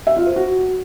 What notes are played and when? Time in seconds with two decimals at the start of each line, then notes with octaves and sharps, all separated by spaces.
0.07 E5
0.17 F4
0.26 C5
0.36 F#4